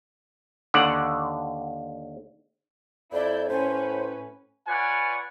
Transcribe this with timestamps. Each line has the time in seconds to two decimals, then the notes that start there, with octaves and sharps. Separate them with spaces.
0.74 D#2 D3 D5 F#5
3.13 F2 E4 D5 G6
3.49 A2 C#4 B4 C5
4.67 F4 B4 C#5 D5 F#5 G#5